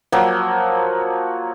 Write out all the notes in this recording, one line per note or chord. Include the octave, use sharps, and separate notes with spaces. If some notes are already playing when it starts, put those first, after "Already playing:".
F3 F#3 A#3